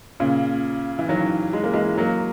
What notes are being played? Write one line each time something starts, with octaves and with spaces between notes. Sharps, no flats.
A#2 C#3
E3
D#3 F#3
G#3
A#3
E3 G#3
F#3 A#3